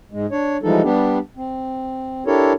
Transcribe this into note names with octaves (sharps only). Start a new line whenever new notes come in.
G#2 G#3
D4 C#5
E3 F3 G3 G#3 D#4 A4
G3 B3 D4 G4
C4
D4 E4 G4 A4 A#4 C#5